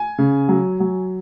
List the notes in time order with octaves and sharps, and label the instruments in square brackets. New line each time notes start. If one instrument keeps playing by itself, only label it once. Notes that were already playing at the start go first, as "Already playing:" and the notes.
Already playing: [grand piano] G#5
C#3
F#3
F#3